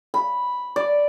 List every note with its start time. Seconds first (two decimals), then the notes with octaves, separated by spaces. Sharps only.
0.14 B5
0.76 D5